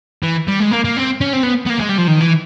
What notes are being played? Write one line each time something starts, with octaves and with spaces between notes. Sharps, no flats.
E3
G3
G#3
A#3
A#3
C4
C#4
C4
B3
B3
A#3
G#3
G3
F3
D#3
E3